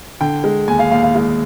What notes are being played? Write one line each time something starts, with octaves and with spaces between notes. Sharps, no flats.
D3 G5
G#3
D#2 G#5
F5
D#2 F5
F5
G#3 F5